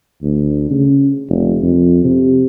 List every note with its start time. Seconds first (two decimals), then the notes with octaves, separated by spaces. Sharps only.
0.23 D2
0.71 C#3
1.29 F1
1.63 F2
2.05 C3